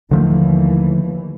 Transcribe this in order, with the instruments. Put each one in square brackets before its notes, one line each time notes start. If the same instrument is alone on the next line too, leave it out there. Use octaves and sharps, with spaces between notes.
[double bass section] D#2 E3 [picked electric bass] D3 F3 A3